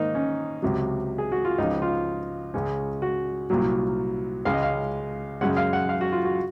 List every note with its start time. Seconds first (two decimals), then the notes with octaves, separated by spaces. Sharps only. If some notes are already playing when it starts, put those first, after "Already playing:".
Already playing: G#2 D#3 A#3 D#4
0.15 C#4
0.62 C#2 C3 F#3
1.18 G#4
1.32 F#4
1.45 F4
1.58 C#2 C#3 F3 D#4
1.82 F4
2.54 C#2 C#3 G#3 C#4
3.02 F#4
3.50 C2 A#2 F#3
4.45 C#2 C#3 G#3 C#4 F5
4.54 D#5
4.63 F5
5.41 F#2 C#3 G#3 C#4 F#5
5.57 F5
5.73 F#5
5.89 F5
6.01 F#4
6.12 F4
6.25 F#4